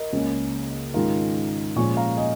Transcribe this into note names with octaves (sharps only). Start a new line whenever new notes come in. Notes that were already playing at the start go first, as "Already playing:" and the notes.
Already playing: A#4 D#5
C#2 C#3 A#3 C#4
G#2 D#3 G#3 C#4 F4 A#4
A#2 F3 G#3 C#4 G#5 C#6
F5 A#5
D#5 G#5